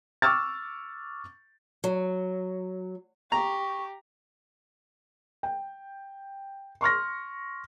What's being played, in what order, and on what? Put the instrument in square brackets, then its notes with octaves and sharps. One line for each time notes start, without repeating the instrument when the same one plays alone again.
[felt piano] C#6 D6 E6 F6 A6
[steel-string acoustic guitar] F#3
[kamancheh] G4 [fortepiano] A#5 [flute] C#6
[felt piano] G5
C6 C#6 F6 A#6